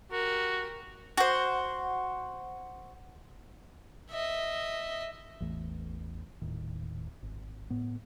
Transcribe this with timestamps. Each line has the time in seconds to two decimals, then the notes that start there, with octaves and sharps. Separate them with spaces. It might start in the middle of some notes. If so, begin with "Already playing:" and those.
0.12 F#4 G4 A#4
1.18 F#4 C5
4.11 D#5 E5
5.40 A1 E2 A2
6.42 D#1 A2 D#3
7.23 G#1
7.70 A2 B3